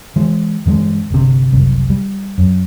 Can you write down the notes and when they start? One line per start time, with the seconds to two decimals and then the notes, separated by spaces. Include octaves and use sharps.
0.16 E3 G#3
0.66 G2 E3 F#3 G#3
1.10 G1 C3
1.52 F#1 C2
1.90 G3
2.38 F#2